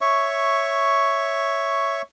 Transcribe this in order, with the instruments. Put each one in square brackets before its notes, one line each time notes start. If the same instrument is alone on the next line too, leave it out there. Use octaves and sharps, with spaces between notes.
[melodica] C#5 E5 C#6